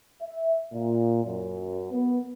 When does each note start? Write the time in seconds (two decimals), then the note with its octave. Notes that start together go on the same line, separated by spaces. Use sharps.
0.21 E5
0.73 A#2
1.24 F#2
1.90 B3